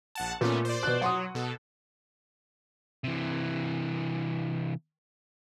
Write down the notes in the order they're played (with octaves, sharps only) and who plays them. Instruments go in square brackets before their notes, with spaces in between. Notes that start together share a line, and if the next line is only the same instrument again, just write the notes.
[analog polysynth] A#1 F#5 A5
[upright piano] A#2 [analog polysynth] A3 B3 C#4
[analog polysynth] C5 D5
[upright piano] B2 F#6
[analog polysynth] F#3 [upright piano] F#5 C6 D#6
[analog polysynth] B2 A4
[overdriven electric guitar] C3 E3